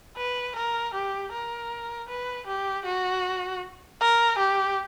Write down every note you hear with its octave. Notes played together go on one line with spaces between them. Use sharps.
B4
A#4
G4
A#4
B4
G4
F#4
A#4
G4